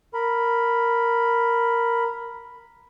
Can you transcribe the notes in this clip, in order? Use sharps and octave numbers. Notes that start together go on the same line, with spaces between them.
A#4 B5